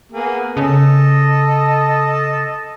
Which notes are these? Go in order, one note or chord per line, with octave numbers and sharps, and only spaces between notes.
A#3 B3 G#4
C#3 A4 D#5 A5